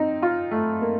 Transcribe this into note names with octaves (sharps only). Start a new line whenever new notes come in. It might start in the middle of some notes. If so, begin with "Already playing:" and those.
Already playing: C4 D#4
F4
A3
A#3